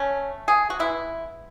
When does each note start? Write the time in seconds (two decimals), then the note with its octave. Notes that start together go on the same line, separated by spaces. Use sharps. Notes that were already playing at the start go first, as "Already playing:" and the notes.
Already playing: A3 C#4
0.48 G#4
0.70 F#4
0.79 E3 G#3 B3 E4